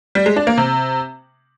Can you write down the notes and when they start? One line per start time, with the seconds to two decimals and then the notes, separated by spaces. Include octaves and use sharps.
0.15 G3
0.26 G#3
0.36 D4
0.47 A#3
0.57 C3